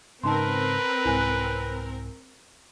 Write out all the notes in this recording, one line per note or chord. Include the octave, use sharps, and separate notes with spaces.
G#2 C#3 C4 D#4 A#4 B4 A5 C6
C2 G#2 E4 G#5 F#6